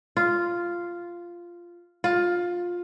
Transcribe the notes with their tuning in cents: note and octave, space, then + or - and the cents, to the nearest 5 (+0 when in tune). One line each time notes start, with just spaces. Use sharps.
F4 -5
F4 +15